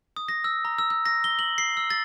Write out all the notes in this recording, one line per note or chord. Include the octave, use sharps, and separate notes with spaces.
D#6
A#6
E6
A#5
E6
E6
A#6
G7
F#7
C7
E6
A6